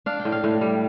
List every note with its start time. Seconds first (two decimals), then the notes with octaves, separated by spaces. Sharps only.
0.06 D4 F5
0.20 G5
0.25 A2
0.32 F5
0.44 A2
0.61 G3